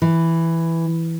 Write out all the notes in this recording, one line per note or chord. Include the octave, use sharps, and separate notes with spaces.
E3